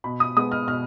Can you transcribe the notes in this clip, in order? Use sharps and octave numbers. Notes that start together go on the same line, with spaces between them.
B2 B5
D#6
G#3 B3 D#6
F6
B2 F6